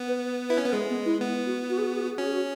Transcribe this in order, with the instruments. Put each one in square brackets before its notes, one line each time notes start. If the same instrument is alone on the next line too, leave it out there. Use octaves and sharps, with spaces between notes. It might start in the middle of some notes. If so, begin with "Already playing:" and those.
Already playing: [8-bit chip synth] B3
[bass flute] B4
[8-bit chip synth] E4 [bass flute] B4
[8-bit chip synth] C#4
B3
[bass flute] B4
[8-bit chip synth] G#3 [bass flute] G#4
[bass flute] B3
E4
[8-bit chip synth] B3
[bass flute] F#4
F#4
G#4
F#4
G#4
F#4
G#4
[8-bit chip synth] C#4 [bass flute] F#4
[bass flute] G#4
F#4